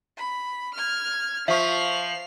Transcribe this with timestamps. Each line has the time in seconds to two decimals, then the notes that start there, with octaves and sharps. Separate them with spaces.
0.18 B5
0.75 F6 G#6
1.48 F3 E5 C#6 C7 F7